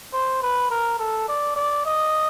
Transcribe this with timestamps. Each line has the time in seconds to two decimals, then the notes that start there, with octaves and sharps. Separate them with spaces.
0.13 C5
0.42 B4
0.70 A#4
0.99 A4
1.28 D5
1.56 D5
1.85 D#5